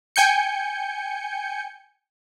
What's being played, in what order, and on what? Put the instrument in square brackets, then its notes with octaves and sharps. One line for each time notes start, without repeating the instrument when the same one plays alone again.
[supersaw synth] G5 G#5 G6 C#7